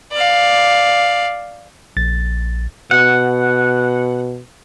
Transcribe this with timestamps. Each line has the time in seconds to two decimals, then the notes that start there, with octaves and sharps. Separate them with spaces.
0.12 D5 F5
1.97 A#1 A6
2.91 B2 F#5